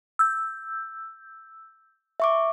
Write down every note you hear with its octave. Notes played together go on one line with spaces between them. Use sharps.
E6 G6
E5 C#6 D6